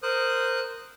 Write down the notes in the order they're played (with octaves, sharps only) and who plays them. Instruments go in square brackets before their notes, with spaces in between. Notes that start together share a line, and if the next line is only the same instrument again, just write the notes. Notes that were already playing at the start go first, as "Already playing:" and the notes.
[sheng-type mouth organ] A#4 C5 D#6 F#6